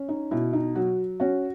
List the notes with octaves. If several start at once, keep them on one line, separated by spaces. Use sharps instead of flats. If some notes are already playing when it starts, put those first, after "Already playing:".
Already playing: C#4
D#4
B2 E4
D#4
F#3 F#4
C#4 F#4